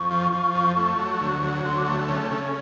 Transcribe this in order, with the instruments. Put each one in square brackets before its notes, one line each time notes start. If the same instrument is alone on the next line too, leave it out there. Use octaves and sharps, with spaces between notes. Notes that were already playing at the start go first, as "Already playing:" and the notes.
Already playing: [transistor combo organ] F2 [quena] C#6
[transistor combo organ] F3
F3
F2
A3
F#3
D2
F#3
[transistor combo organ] D2 [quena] C6
[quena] D6
[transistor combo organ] A3 [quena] C#6
[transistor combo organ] C#3 [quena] C#6
[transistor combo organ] C#3 [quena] C#6